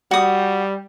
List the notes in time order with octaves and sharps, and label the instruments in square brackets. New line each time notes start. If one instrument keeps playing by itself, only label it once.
[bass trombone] G3 [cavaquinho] F#4 D#6